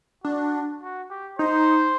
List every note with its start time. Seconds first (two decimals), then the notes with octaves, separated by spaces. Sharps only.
0.24 D4 F#4
0.82 F#4
1.11 G4
1.39 D#4 C5